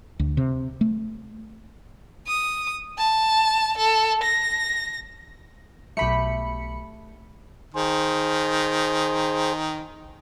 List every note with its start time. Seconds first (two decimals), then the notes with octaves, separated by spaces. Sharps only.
0.19 D2
0.37 C3
0.81 A3
2.27 D#6
2.98 A5
3.77 A4
4.23 A#6
5.97 B1 A3 G4 B5 C#7
7.75 D#3 G#4 C5